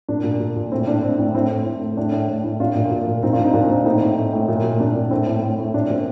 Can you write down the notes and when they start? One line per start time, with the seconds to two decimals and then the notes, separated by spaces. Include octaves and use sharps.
0.08 A#2 D4
0.24 A#2
0.40 A#2
0.56 A#2
0.72 A2 C4
0.87 A2 D4
1.02 A2 C4
1.19 A2 D4
1.34 A2 C4
1.50 A2
1.66 A2
1.81 A2
1.97 A2 D4
2.12 A2
2.29 A2
2.44 A2
2.60 A#2 D4 F4
2.75 A#2
2.91 A#2
3.07 A#2
3.23 A#2 C4 D#4
3.33 D4 F4
3.39 A#2
3.44 C4 D#4
3.54 A#2 D4
3.70 A#2 C4
3.85 A2 C4 D#4
4.01 A2
4.17 A2
4.33 A2
4.48 A#2
4.64 A#2
4.80 A#2 D4
4.95 A#2 D4
5.11 A2 C4
5.27 A2
5.42 A2
5.58 A2
5.74 A#2 D4
5.90 A#2 C4